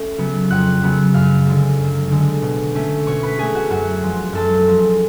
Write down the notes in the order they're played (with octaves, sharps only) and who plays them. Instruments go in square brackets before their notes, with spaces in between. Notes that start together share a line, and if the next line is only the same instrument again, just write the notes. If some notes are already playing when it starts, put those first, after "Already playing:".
Already playing: [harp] A3 C#4
C#3 F#3 B3
F2 F#5 F#6
C#3 F#3 B3
F#2 F5 F6
D3 G#3
F#2
D3 G#3
B2
A3 C#4
B2 C#5 C#6
B4 B5
A3 C#4 G#4 G#5
F#4 F#5
F#2 F#4 F#5
F3 G#3
F#2 A4 A5
F3 G#3